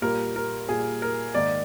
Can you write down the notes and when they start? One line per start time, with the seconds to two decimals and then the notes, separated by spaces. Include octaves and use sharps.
0.02 A#2 G3 A#3 A#4
0.36 A#4
0.68 A#2 G3 A#3 G#4
1.02 A#4
1.35 G#2 D#3 A#3 D5